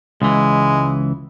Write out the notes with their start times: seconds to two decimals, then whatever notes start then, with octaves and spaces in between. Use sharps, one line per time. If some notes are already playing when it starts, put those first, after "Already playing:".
0.22 C#2 E3 G#3